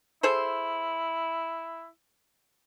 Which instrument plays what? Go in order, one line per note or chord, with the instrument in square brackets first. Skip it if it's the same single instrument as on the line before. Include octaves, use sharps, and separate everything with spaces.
[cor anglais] E4 [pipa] G#4 A4 C5